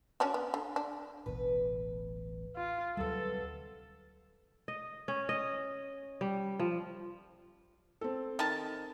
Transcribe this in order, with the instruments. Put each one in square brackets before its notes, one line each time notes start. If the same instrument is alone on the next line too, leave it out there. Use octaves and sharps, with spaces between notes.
[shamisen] C#4 D4 F#4
B3
D3
D4
[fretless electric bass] D1 A1 B2 [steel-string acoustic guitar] B4
[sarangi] F4
[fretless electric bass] D2 F#3 G3 [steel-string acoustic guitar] C3 B3 [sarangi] A4
[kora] D#5
C#4
D#5
G3
F3
[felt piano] C4 A4
[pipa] D#3 A5